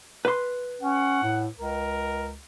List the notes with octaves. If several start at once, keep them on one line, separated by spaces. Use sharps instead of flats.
B4 C6
C#4 F#5
A2
C#2 A#4